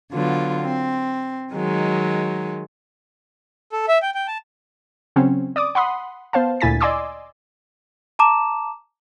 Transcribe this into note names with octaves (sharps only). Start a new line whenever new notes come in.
D3 F#3 B3 F4
C4
D#3 F#3 G#3 D#4
A4
E5
G5
G5
A5
C#3 F#3 C4 C#4
D5 D6 D#6
F#5 B5 C6 D#6
B3 C5 F5 A5
D2 A#2 E4 G#5 A6 B6
D5 D#5 G#5 C6 D6 E6
A5 A#5 D6 E7